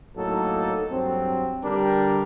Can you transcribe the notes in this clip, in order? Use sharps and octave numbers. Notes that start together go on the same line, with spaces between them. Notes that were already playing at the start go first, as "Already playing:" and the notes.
A2 F#3 A#3 D#4 A4
G2 F#3 C4
D3 G3 D4 G4 A#4